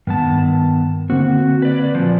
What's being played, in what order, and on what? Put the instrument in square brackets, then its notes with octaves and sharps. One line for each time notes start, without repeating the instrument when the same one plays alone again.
[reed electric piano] G2 [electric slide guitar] D#3 B3 A5
[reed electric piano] D3 A#3 C4 [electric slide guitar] F#4
[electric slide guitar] B4 D5
A#2 F3